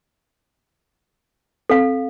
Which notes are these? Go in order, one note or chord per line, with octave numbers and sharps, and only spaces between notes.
C4 A4 F5